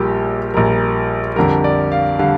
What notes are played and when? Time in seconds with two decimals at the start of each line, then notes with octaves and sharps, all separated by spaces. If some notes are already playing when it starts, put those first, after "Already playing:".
Already playing: A#1 A#2 G3 G4
0.54 A#1 A#2 G3 A#4
1.36 F2 D3 G3 A#4
1.64 D5
1.92 F5
2.19 D3 G3 F5